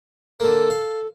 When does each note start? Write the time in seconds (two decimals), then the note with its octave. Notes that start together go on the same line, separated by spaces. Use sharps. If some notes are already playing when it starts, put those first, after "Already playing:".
0.40 D3 A#3 A4
0.70 F5